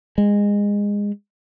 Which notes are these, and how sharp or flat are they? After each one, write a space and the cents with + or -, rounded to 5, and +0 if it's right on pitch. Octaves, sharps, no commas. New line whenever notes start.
G#3 -20